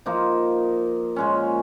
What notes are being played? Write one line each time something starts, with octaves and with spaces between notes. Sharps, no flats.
F3 A#3 D#4
A#2 G#3 C#4